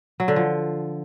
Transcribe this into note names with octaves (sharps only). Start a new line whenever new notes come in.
F#3
D3
F3